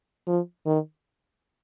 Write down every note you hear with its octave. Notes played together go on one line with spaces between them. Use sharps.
F3
D#3